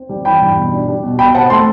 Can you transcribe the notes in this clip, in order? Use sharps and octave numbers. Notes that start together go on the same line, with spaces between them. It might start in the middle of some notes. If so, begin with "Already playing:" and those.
Already playing: C4
G3
E3 G5 B5
G2
B2
D4
G3
B2
B2 G5 B5
C4 F#5 A5
A3 A5 C6